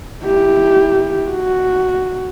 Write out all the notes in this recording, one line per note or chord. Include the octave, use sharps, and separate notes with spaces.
E4 G4
F#4